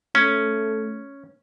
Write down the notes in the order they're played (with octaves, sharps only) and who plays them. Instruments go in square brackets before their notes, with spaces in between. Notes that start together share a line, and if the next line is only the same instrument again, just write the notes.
[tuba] A3 [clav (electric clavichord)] C#4